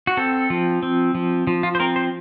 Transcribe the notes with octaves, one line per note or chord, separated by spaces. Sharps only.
F#4
C4 A4
F3
C4
F3
F3
F4
C5
C4 A#4
C5